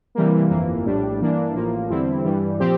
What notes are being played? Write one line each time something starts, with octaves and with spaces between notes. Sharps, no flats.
C3 E3 G3 A#3
G1 F2 E3 A#3
A#1 A2 G3 D4
G2 E3 A#3 D4
A1 A2 F3 A#3
E2 D3 G3 C4 E4
G2 E3 G3
A#2 F3 C4 G4